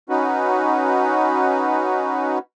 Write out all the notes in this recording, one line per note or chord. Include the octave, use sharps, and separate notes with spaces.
C#4 D#4 F#4 B4